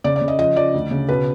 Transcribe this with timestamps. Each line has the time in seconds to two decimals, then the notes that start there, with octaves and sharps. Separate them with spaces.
0.04 C#3 D5
0.16 D5
0.21 C#3
0.28 D#5
0.39 F3 D#5
0.56 F3 D5
0.74 D2
0.91 C#3
1.09 B2 B4